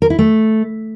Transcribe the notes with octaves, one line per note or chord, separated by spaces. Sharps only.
A#4
E4
A3